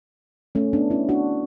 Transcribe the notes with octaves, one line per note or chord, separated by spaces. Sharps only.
A3 C#4
B3 D4
C#4 E4
D4 F#4